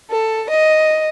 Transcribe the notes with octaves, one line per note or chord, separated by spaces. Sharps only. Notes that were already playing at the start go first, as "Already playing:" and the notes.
A4
D#5